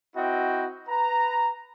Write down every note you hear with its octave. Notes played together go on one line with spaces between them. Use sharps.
C4 E4 F#4 D#5 G5
B4 A#5